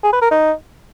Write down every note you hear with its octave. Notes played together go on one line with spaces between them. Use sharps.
G#4
B4
A#4
D#4